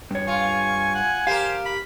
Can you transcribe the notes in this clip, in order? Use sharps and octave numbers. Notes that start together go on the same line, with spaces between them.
G2 C#5
F4 G#5 C#6
F#5
G4 A#4 C5 F5
B5